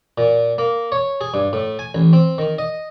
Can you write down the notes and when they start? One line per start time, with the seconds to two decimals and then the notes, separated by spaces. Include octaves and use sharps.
0.18 A#2
0.58 A#3
0.92 C#5
1.21 G#4
1.34 G2
1.53 A2
1.79 G#5
1.95 A1
2.13 C4
2.38 D#3
2.58 D#5